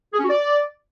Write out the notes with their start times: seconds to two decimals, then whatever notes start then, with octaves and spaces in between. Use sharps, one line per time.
0.13 G#4
0.19 C#4
0.24 F#4
0.29 D5